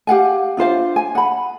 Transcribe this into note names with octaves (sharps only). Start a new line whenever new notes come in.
G4 F5 F#5 G#5
D4 F4 C5 F5
G#5
F#5 B5